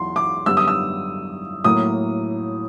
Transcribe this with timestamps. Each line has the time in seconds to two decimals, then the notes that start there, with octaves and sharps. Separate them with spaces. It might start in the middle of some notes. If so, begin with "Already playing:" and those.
Already playing: E2 F#3 C6
0.16 D6
0.46 F#2 D3 G3 B3 E6
0.57 D#6
0.68 E6
1.64 A2 F#3 A#3 D#6